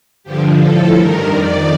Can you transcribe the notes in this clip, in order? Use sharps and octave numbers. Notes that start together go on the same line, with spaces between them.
G2 D3 F3 G4
A2 F3 A4
G2 D#3 A#4
F2 D#3 D5